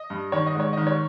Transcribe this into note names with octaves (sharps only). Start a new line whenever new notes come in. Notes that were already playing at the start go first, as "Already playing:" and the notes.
Already playing: D#5
G2
D#3 C#5
D#5
G#2 C#5
D#3 D#5
C#5